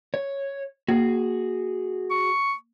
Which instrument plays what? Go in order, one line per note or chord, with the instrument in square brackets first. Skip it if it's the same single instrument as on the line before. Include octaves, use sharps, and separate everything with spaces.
[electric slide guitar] C#5
[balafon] A#3 [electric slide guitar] F#4 G#4
[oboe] C#6